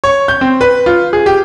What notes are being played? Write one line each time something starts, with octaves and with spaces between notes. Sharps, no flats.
C#5
G6
C4
B4
F4
G#4
G4